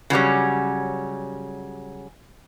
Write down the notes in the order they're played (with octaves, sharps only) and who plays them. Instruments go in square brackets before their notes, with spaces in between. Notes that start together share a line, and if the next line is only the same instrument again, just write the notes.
[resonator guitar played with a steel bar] C#3 F#3 G3 C#4